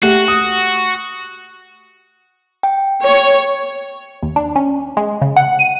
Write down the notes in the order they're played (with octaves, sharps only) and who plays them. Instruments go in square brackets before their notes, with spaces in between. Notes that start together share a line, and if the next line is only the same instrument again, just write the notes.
[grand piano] A3 G4 [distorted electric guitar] F#4
[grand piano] D#6
[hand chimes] G5
[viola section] C#5
[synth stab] D#2
D4
C#4
G#3
C#3
F#5
D#7